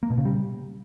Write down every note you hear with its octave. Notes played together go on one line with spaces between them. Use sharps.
A#3
B2
C#3
G3